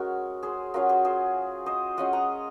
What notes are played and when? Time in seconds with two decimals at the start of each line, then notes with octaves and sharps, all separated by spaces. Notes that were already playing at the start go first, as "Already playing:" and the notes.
Already playing: G#3 C#4 F#4 G#4 A#4
0.43 G#4 C5
0.74 F#3 C#4 F4 F#4 A#4
0.89 G#4 C5
1.05 G#4 C5
1.66 C5 D#5
1.97 G#3 C#4 F4 D#5 F#5
2.13 F#5 A#5